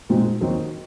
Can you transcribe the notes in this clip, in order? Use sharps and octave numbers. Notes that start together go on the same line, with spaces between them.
A#2 G#3 C4 D#4 F#4
D#2 D#3 F#3 C4 D#4